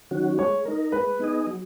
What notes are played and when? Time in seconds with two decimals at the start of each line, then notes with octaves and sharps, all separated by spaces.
0.11 D#3 F#3 C#4 F#4
0.38 G#3 C#5
0.65 D#4 A#4
0.92 G#3 B4
1.19 B3 D#4 G#4 D#5
1.47 F#3